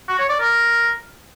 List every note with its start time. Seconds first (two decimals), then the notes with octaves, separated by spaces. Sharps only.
0.08 F#4
0.19 C#5
0.29 D5
0.40 A#4